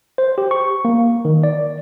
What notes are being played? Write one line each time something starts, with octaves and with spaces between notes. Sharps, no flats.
C5
G4
C#6
A#3
D#3
D5